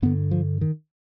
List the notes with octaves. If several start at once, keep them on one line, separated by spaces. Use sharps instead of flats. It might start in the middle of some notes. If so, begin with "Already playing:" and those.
G2 D3 B3
F3
D#3